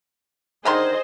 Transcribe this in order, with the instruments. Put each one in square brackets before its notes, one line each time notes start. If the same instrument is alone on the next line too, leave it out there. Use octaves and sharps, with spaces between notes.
[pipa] D3 D#3 C6 [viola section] G#4 C5 D#5